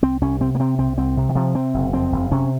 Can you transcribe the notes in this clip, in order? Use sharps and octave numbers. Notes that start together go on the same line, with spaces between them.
C2 C4
C2 C#4
C3 C4
A#3
C3 C4
C2 C4
C2 C4
C3
D#3
C3 F3
C3 C4
F#1
F2 C4
F#1
C3 C#4